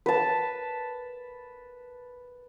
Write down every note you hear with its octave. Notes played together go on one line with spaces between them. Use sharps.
B4 A5